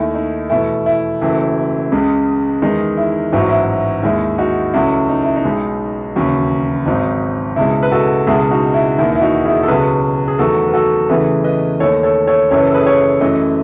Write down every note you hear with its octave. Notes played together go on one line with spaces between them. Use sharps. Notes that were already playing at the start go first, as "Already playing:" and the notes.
Already playing: D#2 D#3 A3 E4
D#4
E2 B2 A3 E4
E4
F#1 F#2 E3 A3
C#2 C#3 G#3
E2 D#3 G#3 D#4
E4
A1 G#2 F#3 E4
F#4
E4
D#2 D#3 G#3 E4
D#4 F#4
C#2 C#3 F#3 A3 E4
D#4
E4
D#4
B1 B2 G#3
E1 D#2 C#3 F#3
G#1 G#2 F#3 D#4
C#2 B2 G#3 E4
B4
F#4 A4
C#2 B2 G#3 E4 G#4
D#4 F#4
E4
E1 D#2 D#3 E4
E4
D#4 F#4
E4 G#4
A4
C#2 B2 F#3 G#4 B4
G#4
E2 D#3 F#3 A3 F#4 A4
B4
F#4 A4
E2 C#3 E3 A3 G#4 B4
B4 D#5
D#2 D#3 A3 A4 C#5
A4 C#5
A4 C#5
F#1 F#2 E3 C#5
B4
A4
G#4 B4
A4 C#5
F#2 E3 A3 B4 D#5